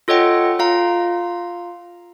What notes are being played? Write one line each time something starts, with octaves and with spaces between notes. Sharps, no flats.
F4 A4 C#5 D#5 F#5 G5
F4 F5 A#5